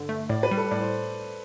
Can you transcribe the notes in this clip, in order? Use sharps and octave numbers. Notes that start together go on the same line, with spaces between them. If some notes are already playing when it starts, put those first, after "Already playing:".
Already playing: G2 D3
A3
A2 D5
B4
G3
A4
A2 D5
C5